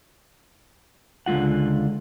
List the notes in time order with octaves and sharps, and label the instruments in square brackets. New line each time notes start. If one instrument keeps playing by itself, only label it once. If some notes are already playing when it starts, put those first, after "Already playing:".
[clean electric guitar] C#2 D3 G#3 F4 F#5